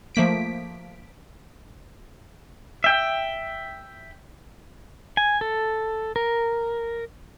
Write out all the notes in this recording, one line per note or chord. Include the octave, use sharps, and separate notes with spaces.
F3 A3 A#3 B6 D7
E5 G5
G#5
A4
A#4